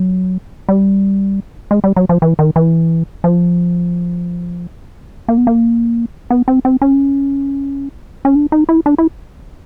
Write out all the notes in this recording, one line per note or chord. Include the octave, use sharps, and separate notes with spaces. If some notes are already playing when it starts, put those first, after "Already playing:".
Already playing: F#3
G3
G#3
G3
F#3
F3
E3
D#3
E3
F3
A#3
B3
A#3
B3
C4
C4
C#4
C#4
D4
D#4
E4
D4
E4